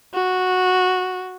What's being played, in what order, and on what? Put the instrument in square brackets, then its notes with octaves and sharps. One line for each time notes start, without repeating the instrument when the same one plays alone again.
[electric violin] F#4